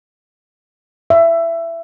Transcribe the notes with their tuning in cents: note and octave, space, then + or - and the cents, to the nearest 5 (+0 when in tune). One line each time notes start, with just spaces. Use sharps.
E5 +20